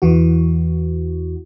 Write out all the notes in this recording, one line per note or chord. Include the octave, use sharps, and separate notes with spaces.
E2 E3 F#4